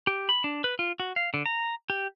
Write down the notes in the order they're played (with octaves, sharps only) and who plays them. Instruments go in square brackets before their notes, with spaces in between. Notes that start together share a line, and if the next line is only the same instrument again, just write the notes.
[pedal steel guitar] G4
B5
D4
B4
F4
F#4
F5
D3
A#5
G4